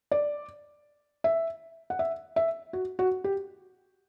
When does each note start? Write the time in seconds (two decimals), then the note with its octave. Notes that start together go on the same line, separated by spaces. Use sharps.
0.11 D5
1.24 E5
1.90 F#5
1.99 E5
2.36 E5
2.73 F#4
2.99 F#4
3.24 G4